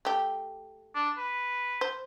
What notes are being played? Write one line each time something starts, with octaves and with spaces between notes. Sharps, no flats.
A3 G4
D4
B4
C5